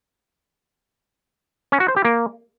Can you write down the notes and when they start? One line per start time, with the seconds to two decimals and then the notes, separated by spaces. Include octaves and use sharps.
1.72 C#4
1.80 F#4
1.88 C5
1.96 G4
2.05 A#3